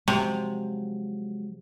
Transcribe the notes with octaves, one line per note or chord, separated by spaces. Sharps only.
C3 F3 F#3 G#3